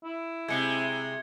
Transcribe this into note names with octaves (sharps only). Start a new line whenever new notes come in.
E4
C3 G#3 G#6 C#7 G7